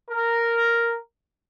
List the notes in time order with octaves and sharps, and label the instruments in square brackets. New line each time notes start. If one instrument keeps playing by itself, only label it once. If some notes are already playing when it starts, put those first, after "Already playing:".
[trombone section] A#4